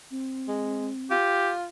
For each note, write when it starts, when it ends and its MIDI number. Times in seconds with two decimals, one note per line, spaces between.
0.11 1.14 60
0.48 0.90 56
1.11 1.66 65
1.11 1.50 67